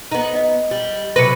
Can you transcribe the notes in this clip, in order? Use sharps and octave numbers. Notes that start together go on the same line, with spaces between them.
B3 D#4
D#5
G3
C3 F#3 B4 A#6 C#7